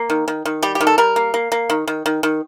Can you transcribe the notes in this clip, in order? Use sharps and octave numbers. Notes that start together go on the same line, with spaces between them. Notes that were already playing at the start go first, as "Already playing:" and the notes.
Already playing: A#3
D#3
D#3
D#3
G3 G4
G4
D#3
A4
G3 A#4
A#3
A#3
A#3
D#3
D#3
D#3
D#3